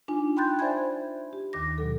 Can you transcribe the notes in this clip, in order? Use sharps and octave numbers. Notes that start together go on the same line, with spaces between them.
D4 D#4 F4 G#5
G5 B5 C6 F#6 G6 A6
C5 D5 E5 G#5 B5 G#6
G4
D#2 D#3 D6 A#6
B2 F#3 A4